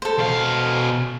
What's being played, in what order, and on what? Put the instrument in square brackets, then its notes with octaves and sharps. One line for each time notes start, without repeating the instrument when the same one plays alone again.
[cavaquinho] A4 C5
[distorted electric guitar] B2 F5